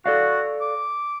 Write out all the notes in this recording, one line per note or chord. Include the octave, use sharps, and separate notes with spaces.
F#4 A4 D5 F5
D6